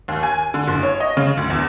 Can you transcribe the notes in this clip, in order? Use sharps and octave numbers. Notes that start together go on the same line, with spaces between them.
D#2
G#5
D3
F#1
C#5
D#5
C#3
D2
E2